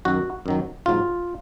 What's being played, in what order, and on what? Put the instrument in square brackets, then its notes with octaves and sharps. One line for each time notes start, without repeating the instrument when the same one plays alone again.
[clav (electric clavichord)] F#2 D#3 F#3 F#4
F#2 D#3 F#3
A#1 G#2 F#3 F4